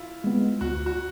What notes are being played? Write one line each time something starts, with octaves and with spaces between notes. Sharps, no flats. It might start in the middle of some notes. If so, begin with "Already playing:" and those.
Already playing: E4 F4
G#3 B3
D2 F#4
F#4